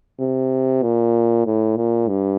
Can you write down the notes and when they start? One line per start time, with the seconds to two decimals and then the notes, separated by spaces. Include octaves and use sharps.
0.20 C3
0.83 A#2
1.46 A2
1.77 A#2
2.09 G2